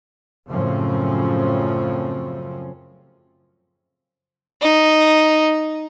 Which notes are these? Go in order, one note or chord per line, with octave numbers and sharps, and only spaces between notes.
F#2 A2 C#3 F3 C4 C#4
D#4